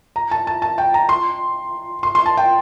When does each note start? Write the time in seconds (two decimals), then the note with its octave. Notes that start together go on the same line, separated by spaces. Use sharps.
0.16 A#5
0.31 A5
0.47 A5
0.62 A5
0.78 G5
0.94 A#5
1.09 C6
2.03 C6
2.15 C6
2.26 A5
2.37 G5